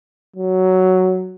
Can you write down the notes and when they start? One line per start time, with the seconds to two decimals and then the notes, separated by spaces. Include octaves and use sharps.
0.36 F#3